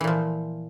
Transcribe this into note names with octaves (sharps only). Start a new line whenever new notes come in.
A#2 E3 F3